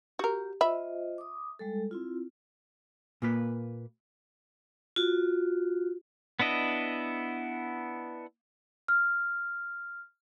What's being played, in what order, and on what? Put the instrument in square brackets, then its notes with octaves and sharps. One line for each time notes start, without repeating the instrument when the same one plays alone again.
[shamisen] F#4 A#4 [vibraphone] G4
[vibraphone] F4 C5 D#5 [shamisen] E5 B5
[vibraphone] D6 D#6
G3 G#3 A4
C4 E4 F4
[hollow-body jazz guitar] A#2 A#3 B4
[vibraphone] F4 F#4
[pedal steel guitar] B3 D4 E4 D#5
[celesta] F6